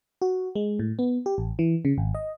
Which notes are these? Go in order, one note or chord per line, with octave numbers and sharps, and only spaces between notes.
F#4
G#3
A2
B3
G4
A1
E3
C#3
G#1
D#5